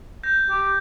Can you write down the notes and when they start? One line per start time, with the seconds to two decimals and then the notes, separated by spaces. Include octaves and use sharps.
0.23 G6 A#6
0.50 G4